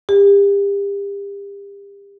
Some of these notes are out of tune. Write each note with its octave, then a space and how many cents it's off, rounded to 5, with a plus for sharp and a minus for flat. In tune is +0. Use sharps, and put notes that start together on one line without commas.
G4 +35